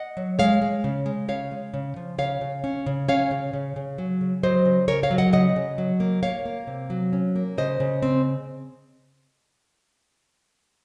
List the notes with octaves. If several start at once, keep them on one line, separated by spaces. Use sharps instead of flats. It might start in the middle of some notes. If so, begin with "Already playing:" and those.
Already playing: D#5 F#5
F#3
G#3 C#5 F5
G#3
C#3
G#3
C#3 C#5 F5
G#3
C#3
F3
C#3 C#5 F5
C#3
C#4
C#3
C#4 C#5 F5
C#3
C#3
C#3
F#3
C#3
F#3 C5 D#5
C#3
C#3 A#4 C#5
C#5 F5
F#3
D#5 F#5
C#3 D#5 F#5
C#3
F#3
A#3
A#3 C#5 F5
A#3
C3
F#3
C#4
A#3
C#3 C5 D#5
C#3
C4